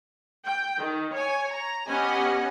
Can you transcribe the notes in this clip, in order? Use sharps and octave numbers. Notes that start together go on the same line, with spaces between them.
G5
D#3
C#5 G#5
A#5
B3 C#4 G4 D#5 F#5 G#5